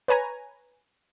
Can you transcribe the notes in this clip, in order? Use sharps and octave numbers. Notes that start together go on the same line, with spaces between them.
B4 C#5 G#5 A#5